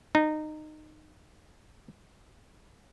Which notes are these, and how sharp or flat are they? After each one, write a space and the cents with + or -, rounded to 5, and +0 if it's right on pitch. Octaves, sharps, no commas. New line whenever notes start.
D#4 -20